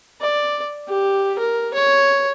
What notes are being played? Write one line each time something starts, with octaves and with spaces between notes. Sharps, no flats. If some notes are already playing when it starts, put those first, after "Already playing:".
D5
G4
A#4
C#5